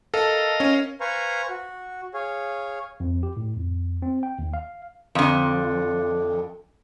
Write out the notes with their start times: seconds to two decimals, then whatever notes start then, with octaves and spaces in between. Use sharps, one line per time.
0.14 A4 A#4 D#5 F5
0.60 C#4
1.00 B4 C5 F5 G#5 A#5 C#6
1.49 F#4
2.14 G#4 C#5 F5
3.00 F2
3.23 G4
3.37 A2
3.57 F2
4.02 C4
4.23 G5
4.39 D#2
4.54 F5
5.15 F2 D3